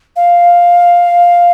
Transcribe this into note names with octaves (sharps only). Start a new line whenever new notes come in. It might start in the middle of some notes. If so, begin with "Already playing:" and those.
F5